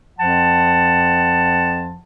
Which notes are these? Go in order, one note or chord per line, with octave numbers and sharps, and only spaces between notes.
F2 F3 F#5 A5